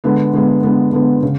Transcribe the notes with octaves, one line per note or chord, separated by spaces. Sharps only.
D3 G#3 B3
D3 G#3 B3
D3 G#3 B3
D3 G#3 B3
C#3